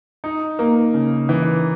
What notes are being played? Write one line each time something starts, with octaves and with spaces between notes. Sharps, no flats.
D#4
A#3
C#3
E3